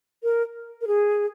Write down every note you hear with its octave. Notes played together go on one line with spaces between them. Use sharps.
A#4
A#4
G#4